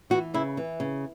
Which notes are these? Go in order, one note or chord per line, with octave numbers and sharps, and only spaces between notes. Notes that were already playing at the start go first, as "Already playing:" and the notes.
E3 F#4
C#3 E4
E3
C#3